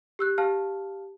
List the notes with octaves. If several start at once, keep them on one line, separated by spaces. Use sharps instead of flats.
G4 E6 F#6
G4 F5 A5 F6